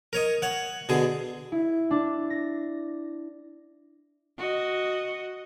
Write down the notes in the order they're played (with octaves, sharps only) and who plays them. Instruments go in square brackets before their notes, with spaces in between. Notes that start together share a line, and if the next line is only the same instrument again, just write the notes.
[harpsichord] A#4 C#5 D#5
C#5 F#5
B2 D3 G#4
[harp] E4
D4
A#6
[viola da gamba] F#4 D#5